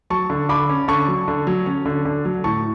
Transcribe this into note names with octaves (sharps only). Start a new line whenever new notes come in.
F#3 A5 C#6
D3
D3 B5 D6
C#4
D3 A5 C#6
F#3
D3
F#3
C#4
D3
D3
F#3
A2 A5 C#6